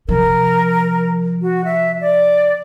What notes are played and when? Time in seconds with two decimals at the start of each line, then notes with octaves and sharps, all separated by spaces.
0.09 C3 F3 A#4
1.42 F#4
1.65 E5
2.01 D5